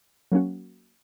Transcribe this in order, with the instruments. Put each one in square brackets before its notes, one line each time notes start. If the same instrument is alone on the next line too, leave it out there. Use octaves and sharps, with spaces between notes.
[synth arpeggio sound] F#3 A#3 C#4 F#4